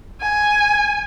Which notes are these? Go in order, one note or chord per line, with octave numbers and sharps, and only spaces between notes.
G#5